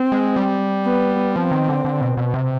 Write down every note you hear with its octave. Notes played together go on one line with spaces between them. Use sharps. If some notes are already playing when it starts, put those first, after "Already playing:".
Already playing: C4
G#3
G3
B3
F3 C4
D#3
D3
D3
B2
B2
C3